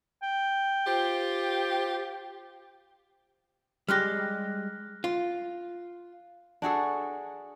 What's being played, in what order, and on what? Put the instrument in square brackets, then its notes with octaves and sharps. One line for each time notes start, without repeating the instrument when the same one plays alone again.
[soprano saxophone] G5
[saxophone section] F4 G4 C5
[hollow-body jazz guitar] G3 G#3 G4 [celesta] F6 F#6 A#6
[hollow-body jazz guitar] F4
[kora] D4 F#4 G#4 A4